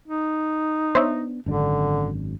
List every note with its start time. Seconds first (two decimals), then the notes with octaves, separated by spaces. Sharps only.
0.08 D#4
0.95 B3 D4 C5 C#5 E5
1.46 G#1 F#2 D3 D4